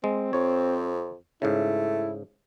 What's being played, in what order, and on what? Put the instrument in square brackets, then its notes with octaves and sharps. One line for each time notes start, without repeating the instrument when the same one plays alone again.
[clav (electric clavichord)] G#3 [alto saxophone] C4
[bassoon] F2 [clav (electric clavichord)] C#5
[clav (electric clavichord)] G#2 C#3 [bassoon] A3 [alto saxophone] E4